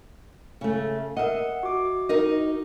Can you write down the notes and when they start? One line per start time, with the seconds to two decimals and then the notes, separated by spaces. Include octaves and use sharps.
0.61 C#3 A3
1.17 A#4 D#5 E5 F#5
1.63 F#4 D6
2.09 D#4 A#4 D#5